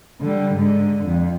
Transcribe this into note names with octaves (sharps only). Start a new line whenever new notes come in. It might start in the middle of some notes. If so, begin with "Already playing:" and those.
D3 G3
G#2 D3
F2